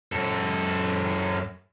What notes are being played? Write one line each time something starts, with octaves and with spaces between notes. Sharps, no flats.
F#2 A4